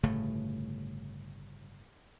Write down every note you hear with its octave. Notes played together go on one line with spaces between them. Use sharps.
G1 A2 C#3 A3